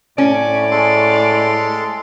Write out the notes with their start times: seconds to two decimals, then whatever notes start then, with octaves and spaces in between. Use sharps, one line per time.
0.18 A2 C#4 D5
0.71 G#3 A4 C6